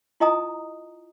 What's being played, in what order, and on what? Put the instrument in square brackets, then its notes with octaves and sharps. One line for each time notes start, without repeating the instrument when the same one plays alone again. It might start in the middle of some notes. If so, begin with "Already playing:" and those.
[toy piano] E4 F4 D#5 G#5 A#5 D#6